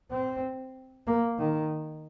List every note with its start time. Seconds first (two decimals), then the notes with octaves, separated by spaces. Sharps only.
0.11 C4
1.07 A#3
1.39 D#3